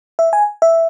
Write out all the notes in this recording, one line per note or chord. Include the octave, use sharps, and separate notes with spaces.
E5
G#5
E5